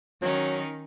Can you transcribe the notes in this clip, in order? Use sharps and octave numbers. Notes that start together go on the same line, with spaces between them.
D#3 F#3 C#4 D#4